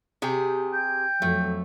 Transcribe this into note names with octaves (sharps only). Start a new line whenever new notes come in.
C3 G4 G#4
G5
F2 F#3 A3